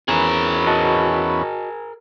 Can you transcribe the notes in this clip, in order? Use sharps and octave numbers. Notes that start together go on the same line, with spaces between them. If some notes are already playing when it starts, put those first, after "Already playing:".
E2 B3 C#4 G#4 A#4
F#4 D#5 A5